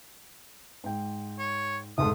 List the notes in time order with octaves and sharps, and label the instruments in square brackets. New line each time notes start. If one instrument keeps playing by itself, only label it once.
[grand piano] G#2 G5
[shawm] C#5
[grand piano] F1 G#2 A4 [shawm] D#6